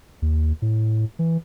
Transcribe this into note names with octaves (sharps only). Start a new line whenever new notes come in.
D#2
A2
E3